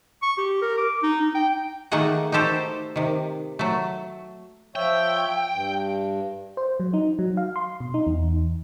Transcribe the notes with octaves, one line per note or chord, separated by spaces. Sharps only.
C#6
G4
A#4
D6
D#4
D#4
G5
D#3 A3 A#3 G#4 D#5 F#5
D#4 F#4 G4 A4 C5
C3 D#3
F#3 A3
F3 C#5 E5 G5
G2
C5
F#3
D#4
F#3
F5
C6
B2
D#4
E2